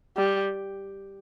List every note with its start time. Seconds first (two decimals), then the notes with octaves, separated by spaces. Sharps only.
0.17 G3